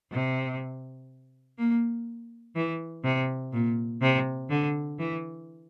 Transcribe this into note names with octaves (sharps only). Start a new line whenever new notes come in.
C3
A#3
E3
C3
A#2
C3
D3
E3